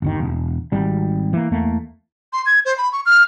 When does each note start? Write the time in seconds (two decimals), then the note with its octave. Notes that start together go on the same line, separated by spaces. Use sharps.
0.02 G1 D#2 D#3
0.20 E1
0.72 G#1 G3
1.33 E3 A#3
1.51 E2 A3 A#3
2.33 C6
2.46 G#6
2.65 C5
2.78 B5
2.92 C#6
3.06 F6